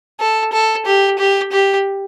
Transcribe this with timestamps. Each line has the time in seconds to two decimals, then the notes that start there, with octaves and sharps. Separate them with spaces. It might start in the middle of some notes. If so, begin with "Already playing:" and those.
0.20 A4
0.53 A4
0.86 G4
1.18 G4
1.52 G4